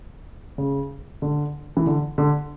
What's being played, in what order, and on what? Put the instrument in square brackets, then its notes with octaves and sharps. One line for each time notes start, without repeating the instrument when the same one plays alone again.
[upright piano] C#3
D3
E3
D3
D3